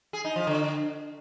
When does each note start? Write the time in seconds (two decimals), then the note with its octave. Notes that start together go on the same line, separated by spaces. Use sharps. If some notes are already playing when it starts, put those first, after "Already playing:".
0.13 G#4
0.25 D#4
0.36 F3
0.47 D3